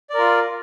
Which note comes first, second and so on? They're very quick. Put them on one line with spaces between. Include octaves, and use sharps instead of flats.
D5 A#4 F4